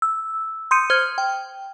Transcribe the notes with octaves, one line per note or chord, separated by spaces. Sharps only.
E6
C6 D#6 G6 C#7 D#7
C5 F6 G#6
G5